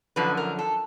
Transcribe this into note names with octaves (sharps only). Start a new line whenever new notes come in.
F#2 D3 F3 B4
A#4
A4